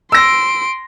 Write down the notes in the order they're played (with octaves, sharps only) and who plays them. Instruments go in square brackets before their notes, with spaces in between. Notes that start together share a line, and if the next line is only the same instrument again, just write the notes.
[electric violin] C6 D7 [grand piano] E6 A#6